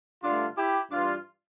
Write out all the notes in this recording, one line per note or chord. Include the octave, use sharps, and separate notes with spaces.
G2 D3 A3 D4 F4
E4 G4
G2 E3 G3 D4 F4